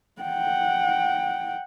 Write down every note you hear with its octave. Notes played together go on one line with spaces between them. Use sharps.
F#5 G5